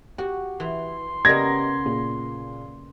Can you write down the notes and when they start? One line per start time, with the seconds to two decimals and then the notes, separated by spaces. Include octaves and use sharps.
0.18 F#4 G4
0.60 E3 C6
1.25 C#3 A#3 B3 G4 D5 D#5 G#6 A#6
1.85 A#2 G#4